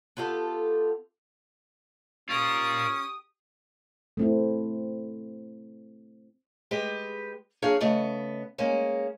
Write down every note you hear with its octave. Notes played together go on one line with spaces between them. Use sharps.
B3 F4 G4 A4
C#4 F4 G4 A#4 C#6 D#6
A3 C4 E4
G#3 G4 B4
F#3 A#3 D4 G#4 C#5 F5
C#3 A3 B3 D#5
G#3 A#3 C#4